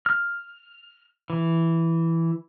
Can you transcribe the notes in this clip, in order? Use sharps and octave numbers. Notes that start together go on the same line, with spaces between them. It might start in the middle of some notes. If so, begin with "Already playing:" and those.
F6
E3